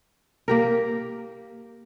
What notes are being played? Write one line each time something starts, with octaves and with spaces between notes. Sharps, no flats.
A#3 G4 A#4